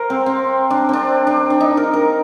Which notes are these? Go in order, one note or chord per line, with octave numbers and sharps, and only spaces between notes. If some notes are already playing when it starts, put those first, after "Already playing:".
Already playing: A#4 C5
C4
C4
D4
C4 D4
D4
D4
D#4
A#4
A#4